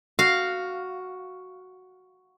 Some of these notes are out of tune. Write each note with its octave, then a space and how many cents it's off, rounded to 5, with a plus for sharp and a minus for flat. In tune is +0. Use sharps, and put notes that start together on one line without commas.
F#4 +0 F5 +0